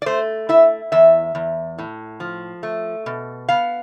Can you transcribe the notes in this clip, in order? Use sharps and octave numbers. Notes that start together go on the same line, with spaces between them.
D5
A3 C5
E4 E5
E2 E5
E2
A2
F3
A3
B2
B3 F5